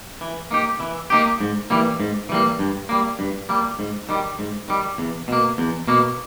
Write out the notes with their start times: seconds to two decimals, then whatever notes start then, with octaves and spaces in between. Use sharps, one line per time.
0.21 E3
0.51 A#3 D#4 G4
0.80 E3
1.10 A#3 D#4 G4
1.41 G#2
1.70 E3 G3 A#3
2.00 G#2
2.29 E3 G3 A#3
2.59 G2
2.89 G3 A#3
3.19 G2
3.49 G3 A#3
3.79 G#2
4.09 D#3 G3
4.39 G#2
4.68 D#3 G3
4.98 E2
5.28 B2 A#3
5.58 E2
5.87 B2 A#3